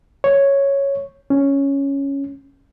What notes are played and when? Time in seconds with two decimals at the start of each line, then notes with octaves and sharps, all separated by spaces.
0.24 C#5
1.30 C#4